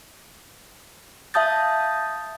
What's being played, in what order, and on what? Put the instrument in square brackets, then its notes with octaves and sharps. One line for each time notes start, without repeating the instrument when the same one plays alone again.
[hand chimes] E5 F5 A5 D#6 G6 A6